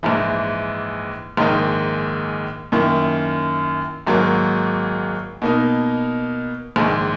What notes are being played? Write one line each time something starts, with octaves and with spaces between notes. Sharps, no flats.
A#1 G#2 E3
A#1 G#2 D#3 A#3 D#4
F#2 D#3 A#3 E4
G#1 G#2 F#3 A#3
B2 A#3 D#4
A#1 G#2 D#3